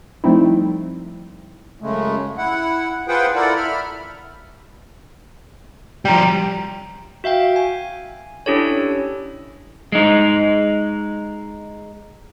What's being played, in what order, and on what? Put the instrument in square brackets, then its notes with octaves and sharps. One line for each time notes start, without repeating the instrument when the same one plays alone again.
[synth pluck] F3 G3 A3 C4 D#4 E4
[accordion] F#2 C#3 G#3 A3
E4 F#5
F4 G#4 B4 C5 F#5 G5
E4 F4 A4 A#4 D5 F#5
E5 B5 F6
[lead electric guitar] F3 G3 [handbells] G5 A#5
[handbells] F#4 E5 F5 G5
G#5
C#4 D4 E4 G4 A4 C#5
[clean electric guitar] G#3 D#4